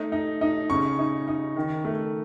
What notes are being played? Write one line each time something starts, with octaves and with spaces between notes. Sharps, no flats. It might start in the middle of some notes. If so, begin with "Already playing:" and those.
Already playing: A3 D#4
D#4
D#4
C#3 C#6
D#4
D#4
D#3
A3